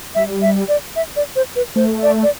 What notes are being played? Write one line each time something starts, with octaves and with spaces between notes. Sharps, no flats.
G3 E5
E5
D5
E5
D5
C5
B4
A3 C5
D5
D5